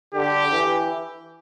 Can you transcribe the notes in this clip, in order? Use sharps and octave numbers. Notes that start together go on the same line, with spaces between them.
D3 G4
E3